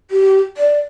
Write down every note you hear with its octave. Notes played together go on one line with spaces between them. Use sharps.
G4
D5